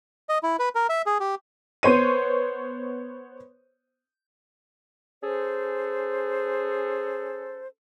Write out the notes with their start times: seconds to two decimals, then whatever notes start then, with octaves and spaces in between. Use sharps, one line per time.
0.29 D#5
0.43 E4
0.59 B4
0.75 A#4
0.89 E5
1.06 G#4
1.20 G4
1.83 B3 C5 C#5 D#7
5.22 C#4 G#4 A4 C5